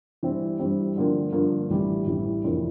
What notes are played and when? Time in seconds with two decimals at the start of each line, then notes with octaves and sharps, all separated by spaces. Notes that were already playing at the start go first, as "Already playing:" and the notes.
0.23 G2 E3 G3 C4
0.59 G2 E3 G3 C4
0.96 G2 D3 F3 A#3
1.32 G2 D3 F3 A#3
1.69 A1 A2 E3 G3
2.06 A1 A2 E3 G3
2.43 F1 F2 E3 A#3 D4